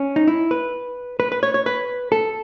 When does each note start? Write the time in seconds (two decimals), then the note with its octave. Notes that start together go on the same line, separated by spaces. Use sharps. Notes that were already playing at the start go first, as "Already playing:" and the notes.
Already playing: C#4
0.16 D#4
0.27 E4
0.51 B4
1.20 B4
1.32 B4
1.43 C#5
1.54 C#5
1.66 B4
2.12 A4